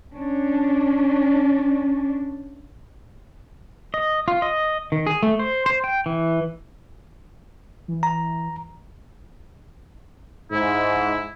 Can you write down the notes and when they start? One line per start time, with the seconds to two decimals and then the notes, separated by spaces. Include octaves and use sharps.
0.14 C#4 D4
3.94 D#5
4.28 F4
4.42 D#5
4.92 D#3
5.07 G#4
5.23 A3
5.39 C5
5.66 C5
5.84 G5
6.06 E3
7.88 E3
8.03 A#5
10.52 G#2 E4